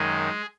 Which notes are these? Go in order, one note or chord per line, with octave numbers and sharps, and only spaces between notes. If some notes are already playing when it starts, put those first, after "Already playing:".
Already playing: F#2 D#3 G#3 G#4